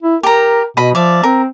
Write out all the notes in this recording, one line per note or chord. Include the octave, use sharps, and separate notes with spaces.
E4
G4 A#4 A#5
B2 D#5 B5
F3 D5 E5 F5
C4 A#4